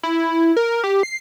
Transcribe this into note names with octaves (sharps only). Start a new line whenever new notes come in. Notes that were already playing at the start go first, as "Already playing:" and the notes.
E4
A#4
G4
C7